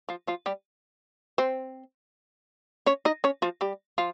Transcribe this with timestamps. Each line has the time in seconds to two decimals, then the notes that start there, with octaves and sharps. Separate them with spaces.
0.09 F3 F4
0.27 F3 F4
0.46 G3 G4
1.38 C4 C5
2.86 C#4 C#5
3.05 D#4 D#5
3.24 C#4 C#5
3.42 F3 F4
3.61 G3 G4
3.98 F3 F4